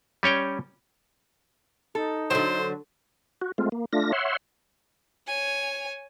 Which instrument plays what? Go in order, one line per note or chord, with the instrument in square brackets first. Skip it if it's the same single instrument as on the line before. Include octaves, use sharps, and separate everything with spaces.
[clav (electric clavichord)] G3 C#4 C#5 G5
[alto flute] D#4 [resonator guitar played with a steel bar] A4
[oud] D3 F#3 [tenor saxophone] C5
[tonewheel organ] F#4
G#3 A3 C4 F4
A#3
A3 D4 F4 A#6
C#5 E5 F#5 C6
[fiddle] C#5 G#5